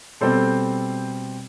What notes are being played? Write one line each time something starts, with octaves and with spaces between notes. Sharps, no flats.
B2 G3 C4 A4 C5